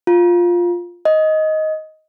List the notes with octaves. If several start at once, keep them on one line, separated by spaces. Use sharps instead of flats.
F4
D#5